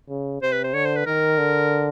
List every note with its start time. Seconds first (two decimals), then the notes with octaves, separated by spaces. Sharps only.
0.10 C#3
0.42 C3 C5
0.52 B4
0.64 C5
0.73 D3 C#5
0.85 C5
0.96 B4
1.06 D#3 A#4
1.38 D3